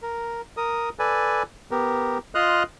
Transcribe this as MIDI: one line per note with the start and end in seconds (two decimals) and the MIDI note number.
0.02 0.41 70
0.57 0.89 70
0.57 0.89 87
0.99 1.43 69
0.99 1.43 71
0.99 1.43 74
0.99 1.43 80
1.71 2.18 59
1.71 2.18 67
1.71 2.18 70
2.35 2.63 65
2.35 2.63 75
2.35 2.63 84
2.35 2.63 87
2.35 2.63 89
2.35 2.63 90